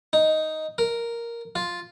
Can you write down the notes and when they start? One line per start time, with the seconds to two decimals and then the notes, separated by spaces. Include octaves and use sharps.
0.13 D#4
0.78 A#4
1.55 F4